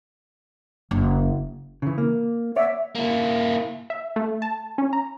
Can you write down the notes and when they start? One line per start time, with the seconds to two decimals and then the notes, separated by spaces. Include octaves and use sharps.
0.91 F#1
1.82 C#3 E3
1.98 A#3
2.56 C#5 D5 E5 F#5
2.95 A#3 E4
3.90 E5
4.16 A3
4.42 A5
4.78 C#4
4.93 A#5